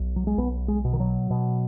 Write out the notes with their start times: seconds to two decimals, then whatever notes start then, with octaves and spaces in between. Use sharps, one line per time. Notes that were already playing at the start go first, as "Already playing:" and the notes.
Already playing: B1
0.16 F#3
0.27 G#3
0.37 B1 B3
0.68 G#3
0.85 B2
0.93 D#3
1.00 F#3
1.30 B2